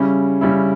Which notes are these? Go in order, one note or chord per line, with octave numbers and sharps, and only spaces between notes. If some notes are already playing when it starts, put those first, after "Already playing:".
Already playing: C#3 G3 C#4 E4
C#3 G3 C#4 E4